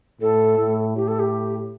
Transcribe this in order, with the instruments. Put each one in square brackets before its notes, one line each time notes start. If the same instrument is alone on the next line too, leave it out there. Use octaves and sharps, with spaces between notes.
[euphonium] A2 [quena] A4
[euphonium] A2
[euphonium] A2 [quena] G4
[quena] A4
G4